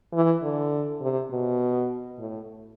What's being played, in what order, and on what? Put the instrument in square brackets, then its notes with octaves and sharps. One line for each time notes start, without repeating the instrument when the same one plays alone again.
[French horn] E3
D3
C3
B2
A2